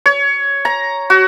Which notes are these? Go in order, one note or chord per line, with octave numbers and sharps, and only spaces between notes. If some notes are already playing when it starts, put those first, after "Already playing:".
C#5
A#5
F#4